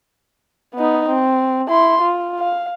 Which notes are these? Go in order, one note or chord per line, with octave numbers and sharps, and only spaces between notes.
B3 D#4
C4
E4 C6
F4
F5